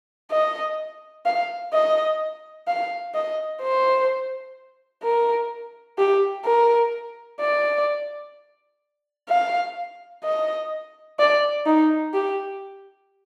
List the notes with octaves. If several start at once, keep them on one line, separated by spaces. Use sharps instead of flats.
D#5
F5
D#5
F5
D#5
C5
A#4
G4
A#4
D5
F5
D#5
D5
D#4
G4